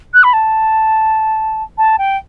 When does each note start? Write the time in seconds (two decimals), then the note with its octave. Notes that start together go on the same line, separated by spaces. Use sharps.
0.14 F#6
0.24 B5
0.33 A5
1.78 A5
1.98 G5